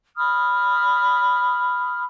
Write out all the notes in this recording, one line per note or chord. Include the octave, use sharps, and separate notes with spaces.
B5 D#6 F6